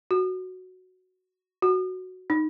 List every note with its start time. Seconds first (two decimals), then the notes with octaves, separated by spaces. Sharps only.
0.11 F#4
1.62 F#4
2.30 D#4